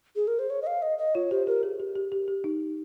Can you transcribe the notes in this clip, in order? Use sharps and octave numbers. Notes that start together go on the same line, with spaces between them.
G#4
A#4
C5
C#5
D#5
F5
D#5
D#5
F4 C#5
G4 C5
G4 A#4
G#4
G4
G4
G4
G4
D#4